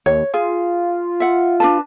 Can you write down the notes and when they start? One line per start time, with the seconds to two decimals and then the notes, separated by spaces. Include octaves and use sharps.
0.06 D#2 C#5
0.34 F4 G#4
1.20 E5 F#5
1.60 D4 B4 A5